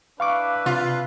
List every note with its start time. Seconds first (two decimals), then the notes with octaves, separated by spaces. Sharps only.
0.20 D4 E4 B4 F5 C#6 D6
0.66 C3 F4